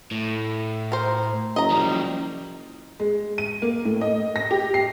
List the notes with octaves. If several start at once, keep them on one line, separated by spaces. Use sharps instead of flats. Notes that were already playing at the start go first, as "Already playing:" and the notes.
A2
A#4 C5
F#1 D#5 A#5
F3 G3
G#3
D#7
A#3
A2
D#5
A#6
G4
C7